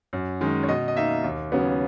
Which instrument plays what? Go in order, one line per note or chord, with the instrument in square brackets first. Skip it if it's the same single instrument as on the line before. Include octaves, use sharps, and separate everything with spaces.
[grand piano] F#2
D#3 G#3 C#4
C#5
B2 D#5
D#5
A#3 D#4 E5
D#2
C#3 F#3 B3